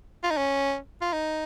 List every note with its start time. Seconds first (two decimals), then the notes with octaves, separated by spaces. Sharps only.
0.24 F4
0.31 D#4
0.37 C#4
1.01 F4
1.13 D#4